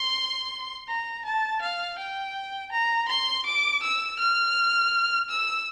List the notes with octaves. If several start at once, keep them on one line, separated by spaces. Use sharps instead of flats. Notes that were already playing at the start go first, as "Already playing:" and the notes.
Already playing: C6
A#5
A5
F5
G5
A#5
C6
D6
E6
F6
E6